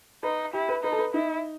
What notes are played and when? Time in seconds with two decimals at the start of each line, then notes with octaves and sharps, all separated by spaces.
0.23 D#4 B4
0.53 E4 G4
0.69 B4
0.83 D#4 B4
0.92 A4
0.99 B4
1.14 D#4 E4